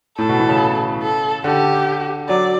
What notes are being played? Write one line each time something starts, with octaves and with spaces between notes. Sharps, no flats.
A2 A4
B2
E3
C#3
A4
D3 G4
F#3 D5